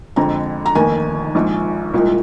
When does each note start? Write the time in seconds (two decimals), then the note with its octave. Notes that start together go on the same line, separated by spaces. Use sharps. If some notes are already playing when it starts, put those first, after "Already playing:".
0.16 F2 D3 G#3 C4 A#5
0.66 A#5
0.75 F1 D#2 D#3 A#3 G#5
1.35 A#1 G#2 F3
1.93 C2 A#2 F3 G#3